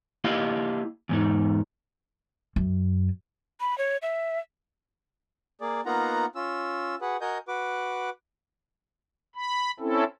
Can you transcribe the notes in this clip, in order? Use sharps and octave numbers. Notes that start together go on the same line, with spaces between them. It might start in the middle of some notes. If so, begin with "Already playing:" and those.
A#3 E4 G4 D#5 F5
E2 G#2 D#4
F#2
B5
C#5
E5
A#3 G#4 D5
A#3 B3 D#4 F4 F#5 A#5
C#4 F4 E6
F#4 G#4 B4 F#5
F#4 A#4 D#5 G#5 G6
F#4 B4 D6
B5
C4 C#4 E4 A4